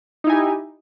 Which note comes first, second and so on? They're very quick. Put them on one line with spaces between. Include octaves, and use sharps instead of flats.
D#4 E4 G#5 G4